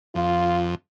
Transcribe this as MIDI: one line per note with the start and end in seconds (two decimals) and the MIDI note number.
0.15 0.75 41
0.15 0.65 65